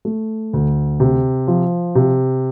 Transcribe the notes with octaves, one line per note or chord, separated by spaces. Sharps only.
A3
D2
C3
F3
C3